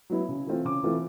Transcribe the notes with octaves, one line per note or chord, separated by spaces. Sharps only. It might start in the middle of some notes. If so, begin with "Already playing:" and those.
F#3 B3 E4
C#3
E3 A3 C4 F4
C#3 D6
E3 A3 C4 F4